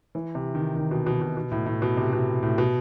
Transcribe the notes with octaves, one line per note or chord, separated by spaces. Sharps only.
E3
C3
D#3
D#3
B2
B2
B2
B2
A2
A2
B2
C3
B2
A2
B2